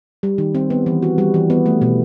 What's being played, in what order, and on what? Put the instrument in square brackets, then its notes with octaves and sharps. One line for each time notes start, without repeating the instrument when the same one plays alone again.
[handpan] G3
D#3
C4
B3
E3
F#4
G3
E3
B3
A3
B2